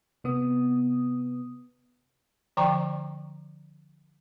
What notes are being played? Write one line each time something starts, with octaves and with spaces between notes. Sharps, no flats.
C3 B3 D#6
D3 F3 D5 G5 A#5 C#6